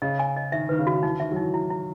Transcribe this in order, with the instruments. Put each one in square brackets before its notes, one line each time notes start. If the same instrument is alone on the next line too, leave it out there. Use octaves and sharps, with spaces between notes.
[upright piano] C#3 [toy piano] D#5
[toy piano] G#5
D#5
[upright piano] D#3 [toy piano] E5
[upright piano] D#3 [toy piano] B4
[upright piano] C#3
[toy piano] F#4
[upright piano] E3 [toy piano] D#4
[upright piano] D#3 [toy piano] E5
[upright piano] F#3
[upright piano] E3 [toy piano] D#4
[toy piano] E4
E4